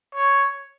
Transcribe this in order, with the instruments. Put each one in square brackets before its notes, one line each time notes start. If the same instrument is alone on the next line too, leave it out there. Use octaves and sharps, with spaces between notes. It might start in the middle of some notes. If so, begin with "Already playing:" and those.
[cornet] C#5